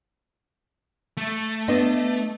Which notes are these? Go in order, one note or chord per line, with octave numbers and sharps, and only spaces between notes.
A3
B3 D4 D#5